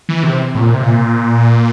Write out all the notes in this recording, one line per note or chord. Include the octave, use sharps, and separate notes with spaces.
E3
C3
A2
A#2
C3
A#2